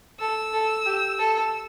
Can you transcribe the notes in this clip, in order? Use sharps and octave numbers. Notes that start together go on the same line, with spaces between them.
A4 E6
A4
G4
A4